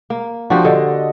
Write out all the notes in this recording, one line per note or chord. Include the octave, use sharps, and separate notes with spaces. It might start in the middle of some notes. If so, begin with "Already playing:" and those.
A#3
F3 D4 F#4 G4 C5
D3 A4 D#5